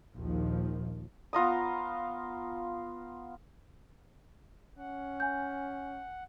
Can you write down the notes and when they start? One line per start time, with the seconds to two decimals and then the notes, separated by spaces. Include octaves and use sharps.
0.14 A#1 D#2 D#3 F3
1.33 B3 F4 A#5 D#6
4.78 C#4 F#5
5.20 G#5 G6